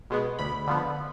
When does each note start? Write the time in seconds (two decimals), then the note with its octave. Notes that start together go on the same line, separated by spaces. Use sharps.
0.10 B2 G#3 B3
0.39 D2 B5
0.67 D3 F3 B3